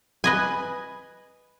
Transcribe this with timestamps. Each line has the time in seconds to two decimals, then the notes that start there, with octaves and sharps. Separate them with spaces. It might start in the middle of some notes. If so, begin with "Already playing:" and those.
0.24 B4 D#5 G#5